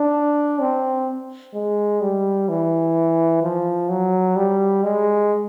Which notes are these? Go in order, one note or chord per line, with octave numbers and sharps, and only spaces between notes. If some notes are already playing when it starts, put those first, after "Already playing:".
Already playing: D4
C4
G#3
G3
E3
F3
F#3
G3
G#3